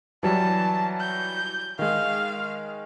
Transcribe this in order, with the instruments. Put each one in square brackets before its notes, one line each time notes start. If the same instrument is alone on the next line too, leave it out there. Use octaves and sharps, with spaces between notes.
[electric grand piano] E3 F#3 G3 [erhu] A5
[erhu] G6
[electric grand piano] D#3 G#3 [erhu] F5